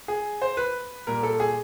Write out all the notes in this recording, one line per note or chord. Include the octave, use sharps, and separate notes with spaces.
G#4
C5
B4
A#2 G3 A#4
A4
G#4